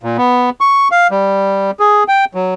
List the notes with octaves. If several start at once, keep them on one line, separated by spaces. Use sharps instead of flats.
A#2
B3
C#6
F5
G3
G#4
G5
F#3